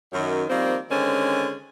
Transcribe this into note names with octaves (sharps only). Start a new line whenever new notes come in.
F#2 D#3
D#3 F3 G3 A#3 C4
D3 D#3 G#3 C4 C#4